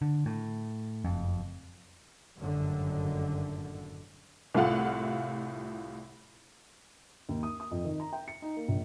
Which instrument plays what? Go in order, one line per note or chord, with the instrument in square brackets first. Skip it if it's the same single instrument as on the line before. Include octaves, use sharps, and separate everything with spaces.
[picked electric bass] D3
A2
F#1 F2
[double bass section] G1 F#2 A2 D3 D#3
[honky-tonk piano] C2 A2 F4 F#5
[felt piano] D#2
D#6
D#6
F2
D#3
A#5
G5
C#7
D#4
A#3
A#1